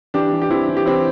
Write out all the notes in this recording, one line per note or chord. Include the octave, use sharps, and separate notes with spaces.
E3 D4 G4
E3
G4
E3 C4 E4
E3
G4
E3 C4 E4